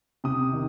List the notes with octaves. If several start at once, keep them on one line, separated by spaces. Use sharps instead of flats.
C3 D#6
D#3